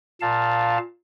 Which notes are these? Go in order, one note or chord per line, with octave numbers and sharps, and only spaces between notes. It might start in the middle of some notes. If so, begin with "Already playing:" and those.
A#2 F5 A5